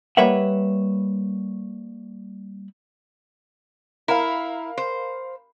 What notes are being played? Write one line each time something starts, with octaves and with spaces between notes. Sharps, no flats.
G3 A#3 B4 C#5 E5 F#5
E4 A#4 F5
C5